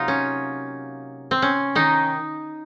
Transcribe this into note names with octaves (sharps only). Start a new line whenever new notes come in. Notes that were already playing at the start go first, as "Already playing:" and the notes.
Already playing: C3 F#3 A#3 D#4 F4
C#4
C4
C#4
D#3 D#4